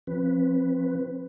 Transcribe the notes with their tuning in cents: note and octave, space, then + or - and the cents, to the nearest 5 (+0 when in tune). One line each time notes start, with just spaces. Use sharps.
F3 +0 C4 +25 B4 +0